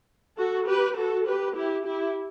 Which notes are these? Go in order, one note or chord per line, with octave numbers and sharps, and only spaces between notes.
F#4 A4
G4 B4
F#4 A4
G4 B4
E4 G4
E4 G4